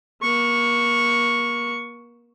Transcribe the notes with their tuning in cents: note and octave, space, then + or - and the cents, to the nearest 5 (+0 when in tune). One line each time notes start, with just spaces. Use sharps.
A#3 +35 C#6 +0